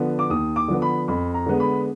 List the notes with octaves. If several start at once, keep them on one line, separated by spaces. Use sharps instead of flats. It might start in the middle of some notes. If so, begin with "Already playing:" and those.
Already playing: D3 F3 B3
D6
D#2 D#6
D6
D3 F3 B3
B5
F2 B5
A#5
D3 G#3 B3
B5